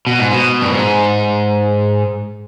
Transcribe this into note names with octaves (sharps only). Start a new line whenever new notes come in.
B2
G#2
B2
G2
G#2